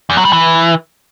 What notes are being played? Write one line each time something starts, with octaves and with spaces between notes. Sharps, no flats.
E2
F#3
G3
E3